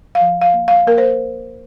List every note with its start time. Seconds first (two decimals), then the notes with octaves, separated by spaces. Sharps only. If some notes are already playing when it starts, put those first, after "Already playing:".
0.15 F5
0.20 F3
0.41 F5
0.53 A#3
0.68 F5
0.87 A#3 A#4
0.98 C5